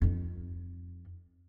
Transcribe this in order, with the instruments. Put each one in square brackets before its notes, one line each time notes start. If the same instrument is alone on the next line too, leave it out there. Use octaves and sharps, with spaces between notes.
[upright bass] F2 D#4